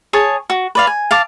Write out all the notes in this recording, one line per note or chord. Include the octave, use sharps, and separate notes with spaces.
G#4 C#5 A5
F#4
B4 D5 F5
G#5
F5 A5 D6